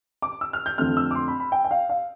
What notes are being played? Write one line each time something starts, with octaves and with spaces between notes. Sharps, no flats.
D6
E6
F6
G6
F2 D3 A3 C4 F6
E6
D6
C6
B5
B5
G5
G5
F5
F5